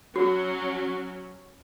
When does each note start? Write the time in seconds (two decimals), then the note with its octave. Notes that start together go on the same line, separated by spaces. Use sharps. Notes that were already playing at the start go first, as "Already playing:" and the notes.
0.16 F#3 C#4 F#4